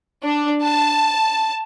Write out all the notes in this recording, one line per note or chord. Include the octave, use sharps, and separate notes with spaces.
D4
A5